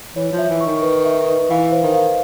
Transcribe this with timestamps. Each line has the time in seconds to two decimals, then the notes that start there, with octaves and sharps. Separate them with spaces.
0.16 E3 C#5
0.33 F3
0.38 E5
0.50 E3
0.61 C#6
0.66 D#3
0.82 B4
1.05 E5
1.28 B4
1.50 E3 F5
1.72 C5
1.83 D#3
1.94 F5